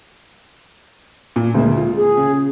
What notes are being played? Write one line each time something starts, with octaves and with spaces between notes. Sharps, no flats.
A#2
D2 G#3 A#3
F4
G#4
C#3